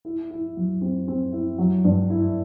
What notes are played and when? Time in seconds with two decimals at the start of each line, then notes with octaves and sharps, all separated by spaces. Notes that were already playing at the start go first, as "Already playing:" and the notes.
0.05 E4
0.30 E4
0.56 F#3
0.81 C4
1.08 C4
1.32 E4
1.58 F#3
1.84 G2
2.10 E4